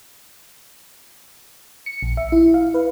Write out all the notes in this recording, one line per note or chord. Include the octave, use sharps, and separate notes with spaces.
C#7
A#1
E5
E4
F5
B4